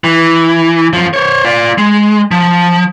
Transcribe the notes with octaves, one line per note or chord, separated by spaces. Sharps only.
E3
F#2 F3
C5 C#5
F4 D5
G#3
F3